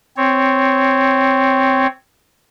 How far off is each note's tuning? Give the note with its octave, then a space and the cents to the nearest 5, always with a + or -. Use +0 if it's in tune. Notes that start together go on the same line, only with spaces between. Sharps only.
C4 +0 C#5 +0